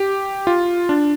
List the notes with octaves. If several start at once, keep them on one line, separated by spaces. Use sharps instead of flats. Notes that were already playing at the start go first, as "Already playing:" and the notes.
Already playing: G4
F4
D4